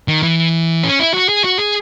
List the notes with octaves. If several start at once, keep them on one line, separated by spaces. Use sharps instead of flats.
D#3
E3
C#4
E4
F#4
G#4
F#4
G#4